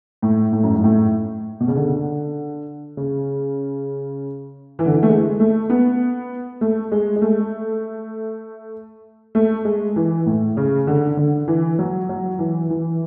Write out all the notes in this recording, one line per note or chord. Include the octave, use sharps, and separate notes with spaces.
A2
A2
F#2
G#2
A2
B2
C#3
D3
C#3
E3
D3
E3
A3
G#3
A3
B3
A3
G#3
G#3
A3
A3
G#3
E3
A2
C#3
D3
D3
E3
F#3
F#3
E3
E3